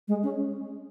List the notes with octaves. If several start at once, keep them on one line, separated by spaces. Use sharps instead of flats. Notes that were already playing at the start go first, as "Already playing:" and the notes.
G#3
C#4